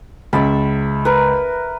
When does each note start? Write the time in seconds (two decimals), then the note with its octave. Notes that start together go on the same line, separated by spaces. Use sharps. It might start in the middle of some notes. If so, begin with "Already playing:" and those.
0.33 C#2 E5 A5 B5
1.05 A#4 B4